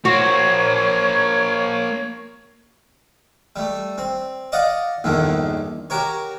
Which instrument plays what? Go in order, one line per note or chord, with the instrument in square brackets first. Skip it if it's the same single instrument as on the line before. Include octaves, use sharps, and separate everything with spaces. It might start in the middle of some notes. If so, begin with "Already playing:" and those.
[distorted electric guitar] A#3 C5 [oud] F#4 [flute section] C#5 C#6
[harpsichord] G3 A3
C4
D5 D#5 F5 F#5
A#1 E2 G2 D3 D#3
F#4 G4 A#4 C#5